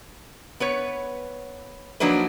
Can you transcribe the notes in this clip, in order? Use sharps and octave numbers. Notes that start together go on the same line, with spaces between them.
B3 B4 C#5
F3 F#3 A#3 D4 D#4 B4